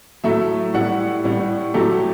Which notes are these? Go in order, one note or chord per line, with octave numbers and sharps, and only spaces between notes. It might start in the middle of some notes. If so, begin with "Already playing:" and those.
A2 F#3 A3 E5
A2 G3 F#5
A2 G3
A2 F#3 A3 G4